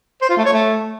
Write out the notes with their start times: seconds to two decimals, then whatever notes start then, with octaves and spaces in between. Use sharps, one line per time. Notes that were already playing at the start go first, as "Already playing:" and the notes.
0.22 C5
0.29 F4
0.37 A3
0.45 C#5
0.53 A3